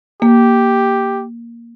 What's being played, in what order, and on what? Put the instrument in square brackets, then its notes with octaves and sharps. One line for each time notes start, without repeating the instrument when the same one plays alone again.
[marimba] A#3 [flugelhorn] G4